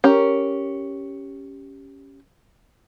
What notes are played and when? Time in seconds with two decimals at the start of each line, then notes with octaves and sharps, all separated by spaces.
0.04 C#4 G4 A#4